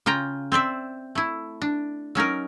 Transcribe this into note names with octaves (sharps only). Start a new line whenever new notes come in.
C#3 F4 G5 A#5
C4 C5 D5 E5
A3 E4
D4
F#3 C#4 D#4 A#4